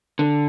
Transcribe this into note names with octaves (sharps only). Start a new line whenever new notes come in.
D3